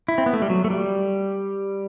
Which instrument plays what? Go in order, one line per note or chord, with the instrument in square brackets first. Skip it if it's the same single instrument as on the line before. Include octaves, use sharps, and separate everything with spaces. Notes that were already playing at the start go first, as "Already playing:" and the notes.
[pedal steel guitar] E4
C4
B3
A3
G3
F#3
A3
G3